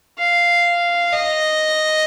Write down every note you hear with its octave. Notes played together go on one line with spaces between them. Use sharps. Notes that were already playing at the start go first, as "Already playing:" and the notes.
F5
D#5